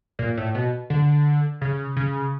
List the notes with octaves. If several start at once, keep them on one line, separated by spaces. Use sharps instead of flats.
A#2
A2
B2
D3
C#3
C#3